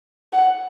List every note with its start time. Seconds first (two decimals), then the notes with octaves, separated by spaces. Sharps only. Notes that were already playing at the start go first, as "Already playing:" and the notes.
0.33 F#5